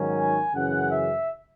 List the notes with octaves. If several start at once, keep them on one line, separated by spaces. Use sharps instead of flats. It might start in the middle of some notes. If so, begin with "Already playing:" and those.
Already playing: G#2 D#3 F#3 C#4
G#5
F#2 C#3 E3 F#5
E5